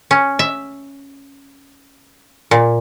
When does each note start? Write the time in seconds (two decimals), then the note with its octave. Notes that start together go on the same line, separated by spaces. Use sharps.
0.11 C#4
0.39 E5
2.51 A#2